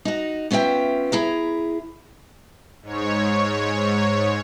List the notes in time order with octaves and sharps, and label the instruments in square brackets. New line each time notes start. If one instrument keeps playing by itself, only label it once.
[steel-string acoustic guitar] D#4 F#4
B3 C#4 F4 E5 G5
E4 G#4 A#5
[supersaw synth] G#2 C#5